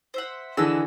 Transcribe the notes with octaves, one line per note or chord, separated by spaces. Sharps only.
C5 E5 F#5
D3 E3 G#4 D#5 A5 E6